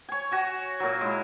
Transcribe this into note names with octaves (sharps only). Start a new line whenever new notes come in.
C#5 G#5
F#4 G#5
A#2 F#3
G#3 E4